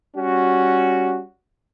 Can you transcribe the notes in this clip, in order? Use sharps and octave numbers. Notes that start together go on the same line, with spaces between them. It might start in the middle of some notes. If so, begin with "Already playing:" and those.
G3 C#4 F#4